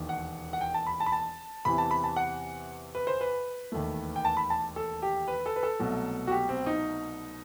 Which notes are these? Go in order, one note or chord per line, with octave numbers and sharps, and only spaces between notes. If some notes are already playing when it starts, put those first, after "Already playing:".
Already playing: E1 D#2 D#3
F#5
F#5
G5
A5
B5
A5
B5
A5
E2 C3 E3 B5
A5
B5
A5
F#5
B4
C5
B4
E1 D#2 D#3 A3
G5
A5
B5
A5
A4
G4
B4
A4
B4
A4
C2 B2 F#3 A3
F#4
G4
C4
D#4